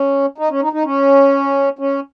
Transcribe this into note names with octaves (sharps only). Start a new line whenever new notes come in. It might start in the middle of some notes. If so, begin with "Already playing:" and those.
Already playing: C#4
D#4
C#4
D#4
D#4
C#4
C#4